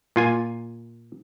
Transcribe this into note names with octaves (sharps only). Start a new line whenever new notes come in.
A#2 F4 G#5